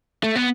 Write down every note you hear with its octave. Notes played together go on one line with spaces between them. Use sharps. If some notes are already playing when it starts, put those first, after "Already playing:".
A3
B3